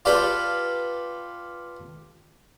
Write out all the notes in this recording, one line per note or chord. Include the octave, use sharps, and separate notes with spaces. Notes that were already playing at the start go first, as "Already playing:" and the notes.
F4 G4 A4 B4 D5 F5